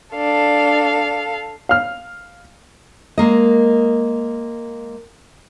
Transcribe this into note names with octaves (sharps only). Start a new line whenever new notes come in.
D4 A4 F5
F5 F6
G#3 A#3 D#5